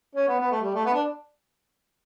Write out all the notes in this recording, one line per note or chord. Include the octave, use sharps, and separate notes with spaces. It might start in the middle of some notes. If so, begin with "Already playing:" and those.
C#4
B3
B3
A3
G3
A3
B3
D4